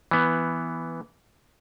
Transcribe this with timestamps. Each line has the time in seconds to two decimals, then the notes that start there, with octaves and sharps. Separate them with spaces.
0.11 E3 B3